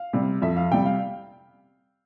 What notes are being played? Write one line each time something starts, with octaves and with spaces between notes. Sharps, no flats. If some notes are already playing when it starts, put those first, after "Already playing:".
Already playing: F5
C3 G3
F2 E5
F5
C3 G3 G5
F5